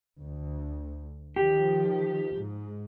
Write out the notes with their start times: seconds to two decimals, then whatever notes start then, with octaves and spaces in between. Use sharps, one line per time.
0.19 D2
1.36 D#3 F3 G4
2.34 G#2